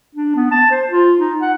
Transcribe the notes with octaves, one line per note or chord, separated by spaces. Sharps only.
D4
B3
A5
C5
F4
D#4
F#5